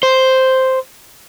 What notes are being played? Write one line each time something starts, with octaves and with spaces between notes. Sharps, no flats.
C5